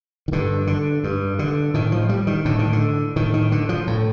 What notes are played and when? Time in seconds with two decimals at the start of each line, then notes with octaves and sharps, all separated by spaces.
0.28 D#3
0.32 G2 D3
0.67 D3
1.04 G2
1.39 D3
1.74 A2 D#3
1.92 F3
2.09 G3
2.27 D#3
2.45 A2 D3
2.59 D#3
2.73 D3
3.16 A2 D#3
3.34 D#3
3.52 D3
3.69 F3
3.87 A2